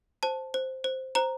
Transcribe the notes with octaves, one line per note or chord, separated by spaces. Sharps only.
C5 A5
C5
C5
C5 A#5